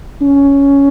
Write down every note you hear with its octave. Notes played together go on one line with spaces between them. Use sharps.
C#4